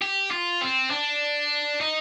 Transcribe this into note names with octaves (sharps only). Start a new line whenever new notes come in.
G4
F4
C4
D4
D#4